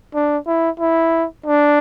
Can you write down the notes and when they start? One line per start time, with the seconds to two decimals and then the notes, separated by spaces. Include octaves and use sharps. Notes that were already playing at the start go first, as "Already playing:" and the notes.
0.15 D4
0.47 E4
0.80 E4
1.46 D4